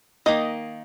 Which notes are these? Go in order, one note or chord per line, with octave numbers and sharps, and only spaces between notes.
D#3 A#3 D#4 D#5